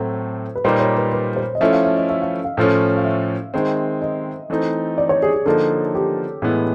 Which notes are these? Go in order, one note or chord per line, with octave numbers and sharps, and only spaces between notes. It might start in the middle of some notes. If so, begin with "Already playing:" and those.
Already playing: A2 F#3 A3 C4
B4
A#2 G3 A#3 D#4 C5
C#5
B4
B4
C5
D#5
F3 A3 C#4 E4 E5
F5
E5
D#5
E5
F5
F5
A2 F3 A3 C#4
F5
E5
D#3 G#3 C4
D#5
E3 A3 C4 D#4
D5
C#5
G#4
G#4
D3 F3 A#3 D#4 A4
G4
A2 E3 G#3 B3